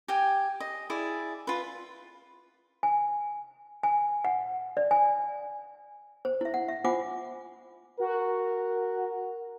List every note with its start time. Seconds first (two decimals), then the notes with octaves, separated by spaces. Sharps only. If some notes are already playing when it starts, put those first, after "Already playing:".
0.08 G4 G5 G#5
0.60 D#5
0.90 E4 G#4 D5
1.47 F4 B4
2.83 G#5
3.83 G#5
4.25 F#5
4.77 D5
4.91 G#5
6.25 C5
6.41 E4 E5
6.54 F#5
6.68 E5
6.84 F4 C5 F#5 G#5 D6
8.00 F#4 A#4